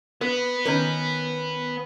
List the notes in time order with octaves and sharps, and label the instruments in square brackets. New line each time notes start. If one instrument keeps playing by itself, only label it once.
[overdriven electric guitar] B3 [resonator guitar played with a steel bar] B4
[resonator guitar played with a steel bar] D#3 C#4 B4